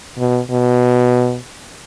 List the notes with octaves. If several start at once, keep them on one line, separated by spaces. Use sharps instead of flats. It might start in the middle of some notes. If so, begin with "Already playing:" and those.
B2
B2